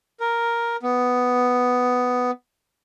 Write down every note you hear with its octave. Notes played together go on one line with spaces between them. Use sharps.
A#4
B3